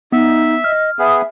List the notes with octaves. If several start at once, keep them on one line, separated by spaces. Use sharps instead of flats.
B3 D#4 E5
D#5 F6
B3 G#4 E5